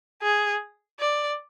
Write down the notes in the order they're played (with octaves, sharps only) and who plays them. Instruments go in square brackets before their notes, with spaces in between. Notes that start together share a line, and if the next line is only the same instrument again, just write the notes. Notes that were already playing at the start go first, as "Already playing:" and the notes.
[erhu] G#4
D5